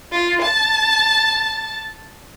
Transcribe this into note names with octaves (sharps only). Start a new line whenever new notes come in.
F4
A5